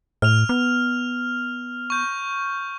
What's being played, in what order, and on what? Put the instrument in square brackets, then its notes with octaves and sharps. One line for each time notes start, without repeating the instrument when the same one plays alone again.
[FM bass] A2 [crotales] F6 F7
[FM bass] B3
[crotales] C#6 G6